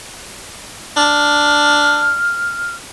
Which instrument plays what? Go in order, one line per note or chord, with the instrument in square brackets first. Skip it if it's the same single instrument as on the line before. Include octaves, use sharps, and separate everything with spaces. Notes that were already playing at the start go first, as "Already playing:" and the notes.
[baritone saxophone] D4 [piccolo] F6